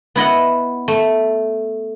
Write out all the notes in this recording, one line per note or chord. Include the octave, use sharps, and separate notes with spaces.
B3 E4 D#5 F#5
A3